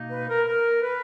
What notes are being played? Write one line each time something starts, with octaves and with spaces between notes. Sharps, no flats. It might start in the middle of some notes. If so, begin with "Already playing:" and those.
Already playing: B2 A#3 D#4
B4
A#4
A#4
B4